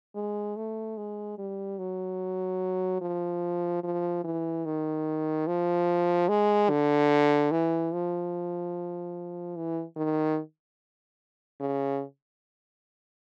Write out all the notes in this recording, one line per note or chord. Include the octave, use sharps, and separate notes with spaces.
G#3
A3
G#3
G3
F#3
F3
F3
E3
D#3
F3
G#3
D3
E3
F3
E3
D#3
C#3